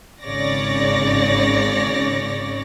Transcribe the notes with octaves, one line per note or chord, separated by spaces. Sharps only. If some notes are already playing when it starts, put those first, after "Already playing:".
G#1 C#3 C#5 D5 A#6